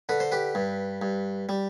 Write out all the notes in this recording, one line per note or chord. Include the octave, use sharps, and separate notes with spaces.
D3 B4
C5
G4 B4
G2
G2
G3